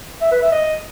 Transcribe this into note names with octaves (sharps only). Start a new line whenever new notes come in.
E5
B4
E5
D#5